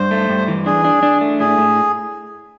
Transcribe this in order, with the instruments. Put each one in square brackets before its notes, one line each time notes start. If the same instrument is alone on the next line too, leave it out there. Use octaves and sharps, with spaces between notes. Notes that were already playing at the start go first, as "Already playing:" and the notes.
Already playing: [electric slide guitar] G2 [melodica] C5
[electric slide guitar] A3
G2
E3
[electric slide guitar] D4 [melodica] G#4
[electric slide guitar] D4
D4
A3
[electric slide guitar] A2 [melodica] G#4
[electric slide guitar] A2